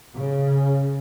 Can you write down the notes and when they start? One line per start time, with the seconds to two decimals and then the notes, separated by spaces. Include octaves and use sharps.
0.14 C#3